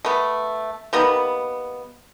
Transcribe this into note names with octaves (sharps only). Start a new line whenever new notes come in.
A3 B3
D#3 G3 A#3 B3